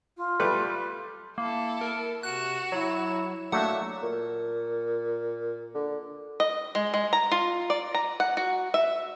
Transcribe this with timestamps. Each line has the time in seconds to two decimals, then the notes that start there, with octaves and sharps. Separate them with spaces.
0.17 F4
0.40 G3 A3 B4
1.38 A#3 E4 A4
1.81 A#4
2.23 C3 F#4 F#6 E7
2.72 F#3 E4
3.52 F#3 A3 A#3 D4 E5 F#5 C#6
4.03 A#2
5.75 D3
6.40 D#5
6.75 G#3
6.94 G#3
7.13 A#5
7.31 F4
7.70 D5
7.95 A#5
8.20 F#5
8.37 F#4
8.74 E5